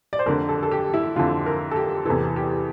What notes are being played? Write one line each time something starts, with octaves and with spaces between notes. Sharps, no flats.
D5
C5
F2 D3 A#4
A4
A4
G4
E4
F2 D3 F4
A#4
A4
G4
E2 C3 E3 A4
G4